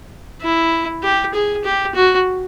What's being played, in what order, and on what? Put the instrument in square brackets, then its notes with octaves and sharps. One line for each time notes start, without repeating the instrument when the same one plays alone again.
[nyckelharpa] E4
G4
G#4
G4
F#4